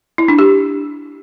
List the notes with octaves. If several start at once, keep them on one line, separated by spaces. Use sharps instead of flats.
E4
D4
G4